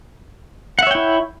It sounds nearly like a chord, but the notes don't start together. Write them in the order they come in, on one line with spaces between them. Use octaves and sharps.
F#5 E5 C#5 G5 E4